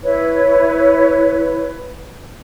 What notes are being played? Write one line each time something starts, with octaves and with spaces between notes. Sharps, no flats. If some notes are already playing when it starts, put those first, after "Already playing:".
E4 B4 C#5